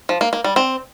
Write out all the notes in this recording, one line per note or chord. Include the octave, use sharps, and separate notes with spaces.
F3
A#3
A#3
G3
C4